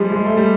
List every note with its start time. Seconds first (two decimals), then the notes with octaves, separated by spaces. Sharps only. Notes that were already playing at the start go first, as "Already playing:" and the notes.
Already playing: F3 G3 G#3
0.12 G#3
0.26 A3
0.37 G3